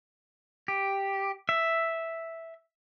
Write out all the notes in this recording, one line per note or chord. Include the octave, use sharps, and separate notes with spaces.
G4
E5